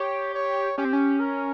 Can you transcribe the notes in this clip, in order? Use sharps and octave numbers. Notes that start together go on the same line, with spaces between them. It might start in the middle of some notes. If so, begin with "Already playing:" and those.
Already playing: G4 C#5
C#5
C#4 G4
C4
C#4
A#4